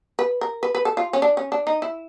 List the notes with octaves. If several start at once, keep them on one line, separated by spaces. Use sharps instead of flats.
B4
A#4
B4
B4
A4
F4
C#4
D4
C#4
D4
D#4
E4